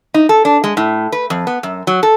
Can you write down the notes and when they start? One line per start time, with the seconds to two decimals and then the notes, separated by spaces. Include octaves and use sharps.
0.14 D#4
0.29 A4
0.45 D4
0.64 G#3
0.77 A2
1.12 B4
1.30 F2
1.47 B3
1.63 F#2
1.87 F#3
2.03 A4